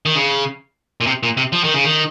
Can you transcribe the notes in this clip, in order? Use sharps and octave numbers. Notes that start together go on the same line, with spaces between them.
D#3
C#3
A#2
C3
A#2
C3
F3
D#3
C#3
D#3